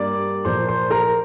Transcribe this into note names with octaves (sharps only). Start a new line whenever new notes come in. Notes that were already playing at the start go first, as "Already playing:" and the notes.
Already playing: G2 G3 A#3 D5 D6
A#2 F3 A#3 C5 C6
C5 C6
A#4 A#5